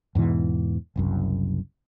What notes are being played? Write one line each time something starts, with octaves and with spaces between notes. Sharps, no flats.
E2 G#2 B2 E3
F#1 C2 F#2